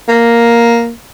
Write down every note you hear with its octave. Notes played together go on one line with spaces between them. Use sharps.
A#3